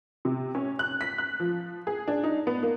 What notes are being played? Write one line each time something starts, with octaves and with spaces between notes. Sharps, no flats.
C3
C#4
F#6
B6
F#6
F3
G#4
D4
D#4
B3
A#3